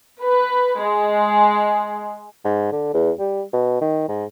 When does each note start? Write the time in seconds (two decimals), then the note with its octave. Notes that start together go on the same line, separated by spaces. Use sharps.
0.23 B4
0.81 G#3
2.45 G#2
2.72 D3
2.94 E2
3.19 G3
3.53 B2
3.81 D#3
4.08 G#2